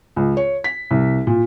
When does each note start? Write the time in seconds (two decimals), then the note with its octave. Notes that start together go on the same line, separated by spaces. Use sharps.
0.16 C#2
0.37 C#5
0.64 B6
0.91 C2
1.27 A#2